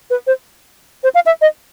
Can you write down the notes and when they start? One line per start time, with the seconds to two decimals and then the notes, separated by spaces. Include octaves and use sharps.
0.10 B4
0.27 C5
1.03 C5
1.15 F5
1.26 E5
1.41 D#5